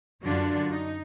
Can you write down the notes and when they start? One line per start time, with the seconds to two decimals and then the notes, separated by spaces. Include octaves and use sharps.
0.24 F#2 D3 D4 F4 F#4
0.71 D#4